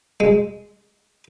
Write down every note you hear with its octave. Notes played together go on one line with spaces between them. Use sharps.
G#3